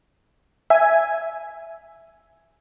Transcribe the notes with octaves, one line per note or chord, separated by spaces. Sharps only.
E5 G#5